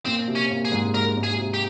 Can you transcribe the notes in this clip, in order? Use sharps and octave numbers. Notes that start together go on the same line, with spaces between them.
A#2 C4
C3
C#4
A#2
G#4
G#2
G#2 A#4
G#2
G#4
C3
G4